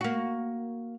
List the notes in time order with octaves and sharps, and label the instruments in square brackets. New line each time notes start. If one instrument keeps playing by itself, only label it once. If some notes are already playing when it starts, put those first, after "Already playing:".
[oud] A#3 F#4